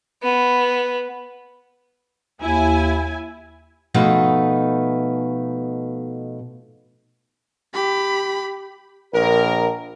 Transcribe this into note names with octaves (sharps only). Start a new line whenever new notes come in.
B3
D#2 E4 G#5
B2 F3 A3 D#4 B4
G4 B5
A#1 A#4